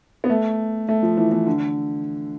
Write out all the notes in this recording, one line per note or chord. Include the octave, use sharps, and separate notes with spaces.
B3
A3
A3
F3
E3
E3
D3